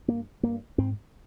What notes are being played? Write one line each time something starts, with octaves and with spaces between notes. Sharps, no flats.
G2 A#3
G2 A#3
G#2 C4